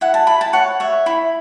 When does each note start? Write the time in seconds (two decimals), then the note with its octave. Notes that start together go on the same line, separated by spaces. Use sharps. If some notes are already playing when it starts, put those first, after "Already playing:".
0.01 E4 F#5
0.14 A5
0.27 E4 B5
0.41 A5
0.53 C#5 F#5
0.80 C#5 E5
1.06 E4 B5